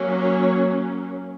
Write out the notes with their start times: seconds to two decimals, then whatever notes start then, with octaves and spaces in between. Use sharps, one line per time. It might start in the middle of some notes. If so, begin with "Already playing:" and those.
Already playing: F#3 A#3 C#4
0.18 C#5